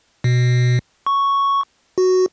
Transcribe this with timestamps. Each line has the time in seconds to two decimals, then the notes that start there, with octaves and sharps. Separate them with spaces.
0.24 B2
1.06 C#6
1.98 F#4